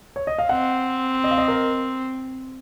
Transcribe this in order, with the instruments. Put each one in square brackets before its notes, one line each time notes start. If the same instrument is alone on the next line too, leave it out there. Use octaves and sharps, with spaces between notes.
[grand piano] C#5
D#5
F5
[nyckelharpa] C4 [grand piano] F#5
[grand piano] D#5
F5
D#5
A#4